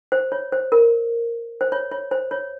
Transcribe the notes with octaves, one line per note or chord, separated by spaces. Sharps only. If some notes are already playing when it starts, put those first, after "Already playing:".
C5
C#5
C5
A#4
C5
C#5
C#5
C5
C#5